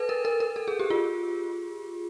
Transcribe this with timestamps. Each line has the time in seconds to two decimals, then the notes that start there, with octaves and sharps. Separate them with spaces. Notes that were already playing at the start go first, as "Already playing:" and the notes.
Already playing: A4 B4
0.09 A#4
0.25 A#4
0.40 A#4
0.56 A4
0.68 G#4
0.79 G4
0.90 F4